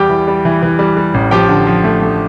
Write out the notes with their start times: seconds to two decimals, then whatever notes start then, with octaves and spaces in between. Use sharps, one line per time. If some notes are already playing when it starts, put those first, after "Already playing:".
Already playing: E2 G3 G4 G5
0.09 E3
0.28 G3
0.45 E3
0.63 E3
0.79 G3
0.97 G3
1.14 A1
1.31 F3 G4 G5
1.49 D3
1.67 F3
1.84 A3
2.02 A3